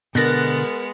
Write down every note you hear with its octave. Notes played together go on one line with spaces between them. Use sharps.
B2 D3 G#3 B3 A#4 F#6 A6 A#6